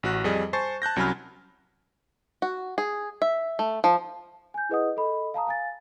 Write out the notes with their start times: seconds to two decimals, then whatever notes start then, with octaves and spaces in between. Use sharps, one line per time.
0.03 A1 F#4 F#6
0.24 F2 G3 G#4 D#5
0.53 C5 G#5 A5 C#6 A6 C7
0.82 A5 F#6 G6 A#6
0.96 C2 F#3 C#4 G#5 B5 F6
2.42 F#4
2.78 G#4
3.22 E5
3.59 A3
3.84 F3
4.54 G#5 G6
4.69 E4 G#4 B4 D#5 F#5 D#6
4.97 A4 D#5 B5
5.34 F5 A5 A#5 D#6
5.47 F5 G#5 A6